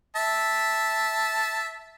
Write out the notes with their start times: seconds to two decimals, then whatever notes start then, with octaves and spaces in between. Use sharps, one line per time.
0.16 E5 A5